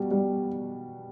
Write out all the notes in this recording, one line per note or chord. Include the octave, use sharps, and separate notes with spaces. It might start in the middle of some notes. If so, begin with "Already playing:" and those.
Already playing: B2 G3
G3